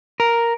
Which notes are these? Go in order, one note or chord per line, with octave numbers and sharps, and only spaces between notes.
A#4